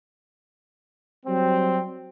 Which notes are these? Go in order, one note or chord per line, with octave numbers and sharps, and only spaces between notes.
F#3 G3 C4